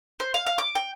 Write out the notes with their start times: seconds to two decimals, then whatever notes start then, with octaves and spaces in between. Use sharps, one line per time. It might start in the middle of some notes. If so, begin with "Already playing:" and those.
0.20 C5
0.34 F5
0.47 F5
0.58 D6
0.75 G5